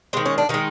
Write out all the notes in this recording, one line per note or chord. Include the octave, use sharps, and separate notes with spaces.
D#3 G#3 C4
C#4
D4
D#3 G#3 D#4